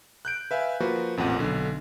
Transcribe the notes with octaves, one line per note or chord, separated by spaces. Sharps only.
F#6 G6 D7
B4 E5 F5 G#5
F3 A#3 F#4 B4
A1 F2 A#2 F#5 D#7
B1 D3